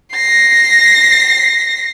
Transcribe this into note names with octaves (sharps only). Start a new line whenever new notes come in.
A#6 C7